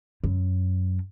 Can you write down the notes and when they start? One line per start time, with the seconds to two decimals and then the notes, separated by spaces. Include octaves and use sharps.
0.24 F#2